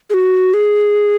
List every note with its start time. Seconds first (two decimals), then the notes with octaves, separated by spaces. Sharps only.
0.10 G#4
0.14 F#4
0.54 G#4